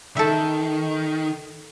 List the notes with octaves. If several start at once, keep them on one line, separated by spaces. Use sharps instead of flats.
D#3 A4 E5